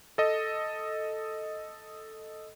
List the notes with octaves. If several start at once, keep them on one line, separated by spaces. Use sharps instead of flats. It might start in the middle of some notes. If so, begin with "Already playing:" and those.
A4 D#5